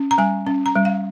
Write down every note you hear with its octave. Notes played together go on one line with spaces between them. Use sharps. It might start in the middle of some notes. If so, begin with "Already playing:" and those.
Already playing: C#4
A#5
G3 G#5
C#4
A#5
G3
F5